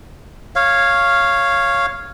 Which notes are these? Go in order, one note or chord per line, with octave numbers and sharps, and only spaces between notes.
C#5 F5